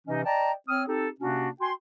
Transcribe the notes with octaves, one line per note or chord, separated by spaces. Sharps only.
C3 E3 C#4 D#4 D#5
D5 D#5 G5 A5 A#5
C4 C#5 D#6 F6
C4 D#4 G4 A4
C3 A#3 C#4 D4 F#4
F#4 G5 G#5 C6